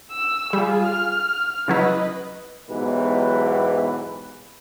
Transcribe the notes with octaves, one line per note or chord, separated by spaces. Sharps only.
E6
G3 F4 G#4
F6
C#3 F#3 E4 B4 D#5
B1 G#2 B2 E3 G4 B4